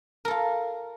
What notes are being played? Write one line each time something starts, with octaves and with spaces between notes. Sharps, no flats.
F4 A4 A#4